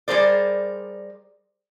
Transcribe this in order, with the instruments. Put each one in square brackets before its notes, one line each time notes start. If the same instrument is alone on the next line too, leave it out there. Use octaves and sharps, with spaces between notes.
[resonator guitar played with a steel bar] G3 G#4 A#4 C5 D5